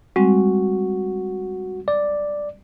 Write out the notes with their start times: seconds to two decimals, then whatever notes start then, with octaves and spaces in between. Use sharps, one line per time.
0.16 G3 G#3 C4 F#4
1.88 D5